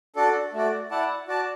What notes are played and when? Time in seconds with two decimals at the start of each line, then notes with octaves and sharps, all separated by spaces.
0.16 D4 F#4 A4 D5
0.53 A3 F#4 D5
0.91 E4 D5 F#5 A5
1.28 F#4 D5 A5